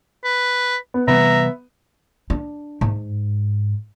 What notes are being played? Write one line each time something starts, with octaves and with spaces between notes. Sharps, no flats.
B4
B3
C3 E3 G3 B3 E5 A#5
D4
G#2